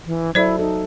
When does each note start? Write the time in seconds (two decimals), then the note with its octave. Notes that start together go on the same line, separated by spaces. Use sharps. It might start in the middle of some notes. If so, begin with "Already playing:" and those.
0.06 E3
0.35 F#3 E4 A4 C5 D5 E5
0.59 D#4 A4